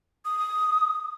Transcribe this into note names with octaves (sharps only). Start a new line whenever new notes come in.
D#6